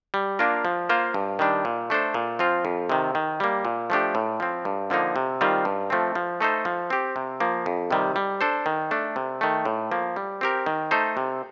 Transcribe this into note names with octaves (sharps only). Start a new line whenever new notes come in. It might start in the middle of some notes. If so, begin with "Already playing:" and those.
G3
A#3 D4 F4 A#4
F3
A#3 F4 C5
G2
D#3 G3 D4
A#2
A3 D4 A4 C5
A#2
F3 C4 F4
F2
C3 D#3
D#3
G3 A#3
A#2
F3 A3 D4 G4
A2
F3 C4
G2
D3 F3 A#3 D#4
C3
D#3 G3 C4 F4
G2
F3 A3 C4
F3
A3 D#4 A4 C5
F3
C4 G4
C3
F3 A#3
F2
C3 D#3 G3
G3
D4 A4 C5
D#3
A3 D4
C3
D#3 A3
A2
F3 A#3
G3
C4 G4 A#4
D#3
A3 D#4 A4 C5
C3